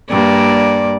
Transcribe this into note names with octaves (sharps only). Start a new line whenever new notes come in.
G2 A#3 D5